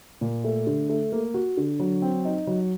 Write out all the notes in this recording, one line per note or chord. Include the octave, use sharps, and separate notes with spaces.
A#2
A3
D3
A3
A#3
F#4
D3
F#3
C4
D#4
F#3